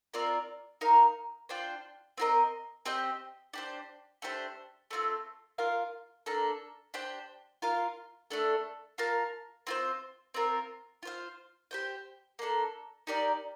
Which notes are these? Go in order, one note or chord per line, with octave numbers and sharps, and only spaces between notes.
C4 F4 A#4 D5
D#4 A#4 F5
D4 F4 C5 G5
C4 F4 A#4 D#5
C4 G4 C5 D#5
D4 G4 C5
A3 D4 G4 C5
A3 C4 F4
F4 A#4 F5
A#3 D4 A4
D4 G4 C5 G5
F4 A#4 F5
A3 D4 A4
F4 A#4 F5 A5
C4 F4 C5
C4 F4 A#4
F4 C5 F5
G4 C5 G5
A#3 D4 A4
D#4 G4 A#4 D5